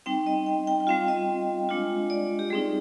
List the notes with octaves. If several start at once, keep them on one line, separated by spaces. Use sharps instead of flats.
G3 C4 D#4 G5
D#5
G5
G5
G5
G3 C4 F4 F5
D#5
G#3 D4 F4
D5
G4
G3 C4 D#4 G#4